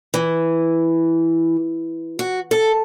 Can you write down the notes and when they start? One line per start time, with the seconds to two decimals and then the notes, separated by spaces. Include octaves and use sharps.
0.14 E3
2.19 F#4
2.51 A4